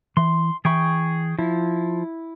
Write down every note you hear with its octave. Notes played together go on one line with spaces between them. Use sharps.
E3 C6
E3 G#4 G5 B5 C#6
F3 E4